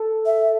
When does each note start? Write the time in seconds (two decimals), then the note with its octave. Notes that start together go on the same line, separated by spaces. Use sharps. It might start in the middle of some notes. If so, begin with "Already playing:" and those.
Already playing: A4
0.26 E5